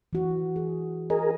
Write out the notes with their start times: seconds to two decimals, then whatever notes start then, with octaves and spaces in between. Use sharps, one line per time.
0.13 E3 F#4
0.56 G#4
1.10 G#4 A#4 D#5